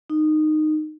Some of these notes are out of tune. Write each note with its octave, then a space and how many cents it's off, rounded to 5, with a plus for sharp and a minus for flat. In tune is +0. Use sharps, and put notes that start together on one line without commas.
D#4 -15